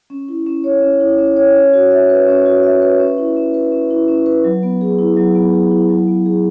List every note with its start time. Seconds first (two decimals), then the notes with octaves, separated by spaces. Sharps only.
0.10 C#4
0.28 E4
0.46 C#4
0.64 C#5
0.82 C#4
1.00 E4
1.18 C#4
1.36 C#5
1.55 C#4
1.73 F#4
1.91 E5
2.10 B4
2.28 C#4
2.46 F#4
2.63 E5
2.82 B4
3.00 C#4
3.18 E4
3.36 C#4
3.54 B4
3.72 C#4
3.90 E4
4.08 C#4
4.26 B4
4.44 F#3
4.63 B3
4.81 G#4
4.99 E4
5.17 F#3
5.35 B3
5.53 G#4
5.71 E4
5.89 F#3
6.08 B3
6.26 G#4